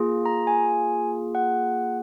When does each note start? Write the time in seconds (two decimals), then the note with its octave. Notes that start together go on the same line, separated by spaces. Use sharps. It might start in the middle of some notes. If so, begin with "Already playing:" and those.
Already playing: A#3 F4 G#4
0.25 A#5
0.47 G#5
1.35 F#5